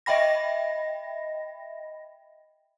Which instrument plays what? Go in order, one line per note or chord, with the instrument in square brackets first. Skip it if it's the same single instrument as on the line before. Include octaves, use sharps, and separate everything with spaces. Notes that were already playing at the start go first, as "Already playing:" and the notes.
[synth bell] D#5 E5 G5 B5 A#6